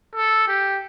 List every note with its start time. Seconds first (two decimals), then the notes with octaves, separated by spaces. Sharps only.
0.15 A4
0.47 G4